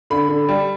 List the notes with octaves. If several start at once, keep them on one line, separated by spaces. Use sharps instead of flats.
D3 B5
D3
G3